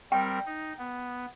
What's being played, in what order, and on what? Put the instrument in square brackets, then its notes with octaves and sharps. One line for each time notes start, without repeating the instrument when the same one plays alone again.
[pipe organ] G3 C4 A#4 [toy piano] G5
[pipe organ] D#4
B3